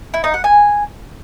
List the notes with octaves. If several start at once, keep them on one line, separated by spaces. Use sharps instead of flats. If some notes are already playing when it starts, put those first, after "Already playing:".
E4
D#4
F#5
G#5